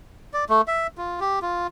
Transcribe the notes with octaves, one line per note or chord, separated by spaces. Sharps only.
D5
A3
E5
F4
G4
F4